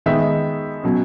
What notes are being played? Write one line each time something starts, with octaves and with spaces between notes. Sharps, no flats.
D#3 G#3 B3 D#4 E5
B2 F#3 C#4